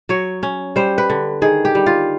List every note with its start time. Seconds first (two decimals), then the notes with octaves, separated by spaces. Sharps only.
0.09 F#3 C#5
0.43 C#4
0.76 G3 C5
0.98 B4
1.10 D3
1.42 D#3 G#4
1.65 G4
1.75 G3
1.86 F4